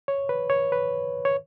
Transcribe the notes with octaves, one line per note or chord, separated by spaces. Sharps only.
C#5
B4
C#5
B4
C#5